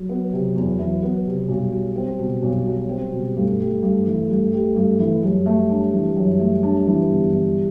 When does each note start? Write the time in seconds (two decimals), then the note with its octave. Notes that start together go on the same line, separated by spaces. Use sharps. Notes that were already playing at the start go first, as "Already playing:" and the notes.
Already playing: F#3
0.09 B3
0.33 C3
0.56 E2
0.79 E3
1.02 B3
1.26 C3
1.48 B1 G3
1.72 F#3
1.96 C4
2.19 B2
2.43 B1
2.66 F#3
2.89 C4
3.12 B2
3.36 G2 A3
3.59 G3
3.83 G2
4.07 E3
4.29 G2
4.52 G3
4.76 G2
4.99 E3
5.23 F#2 G3
5.46 A3
5.70 D4
5.93 E3
6.16 F#2
6.39 A3
6.63 D4
6.87 E3
7.10 G1
7.33 E3